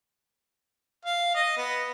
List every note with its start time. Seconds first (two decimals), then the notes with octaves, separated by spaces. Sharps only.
1.06 F5
1.35 D#5
1.57 B3